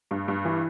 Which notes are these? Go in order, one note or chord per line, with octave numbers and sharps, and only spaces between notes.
G2
G2
E3